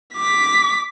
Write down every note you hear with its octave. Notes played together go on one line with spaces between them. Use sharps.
D6 B6